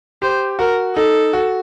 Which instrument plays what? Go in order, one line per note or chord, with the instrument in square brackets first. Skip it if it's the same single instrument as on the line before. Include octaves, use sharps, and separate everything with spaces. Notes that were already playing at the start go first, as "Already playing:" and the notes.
[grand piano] G4 [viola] C5
[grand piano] F#4 [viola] A#4
[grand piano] D#4 [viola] A4
[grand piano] F#4